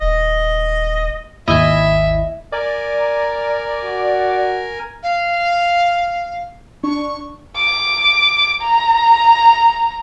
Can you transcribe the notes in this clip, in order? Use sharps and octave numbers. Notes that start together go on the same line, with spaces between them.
D#1 D#5
G#1 D#2 E4 D#5 E5 G#5
A#4 D5 G#5
A#5
F#4
F5
D4 C#6
D6
A#5